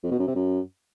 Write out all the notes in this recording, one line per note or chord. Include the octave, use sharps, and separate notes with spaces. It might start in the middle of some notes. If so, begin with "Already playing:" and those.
F2
B2
F#2
C3
F#2